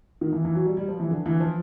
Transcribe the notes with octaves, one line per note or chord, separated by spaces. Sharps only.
D#3
E3
E3
F#3
G3
G3
F3
E3
D3
E3
F3